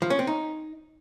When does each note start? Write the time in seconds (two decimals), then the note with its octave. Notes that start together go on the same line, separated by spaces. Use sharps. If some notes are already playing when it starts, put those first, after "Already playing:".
0.02 F3
0.10 C#4
0.19 C4
0.27 D#4